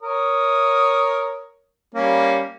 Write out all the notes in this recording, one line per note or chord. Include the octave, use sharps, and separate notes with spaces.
A#4 C#5 D#6
G3 A#3 C#4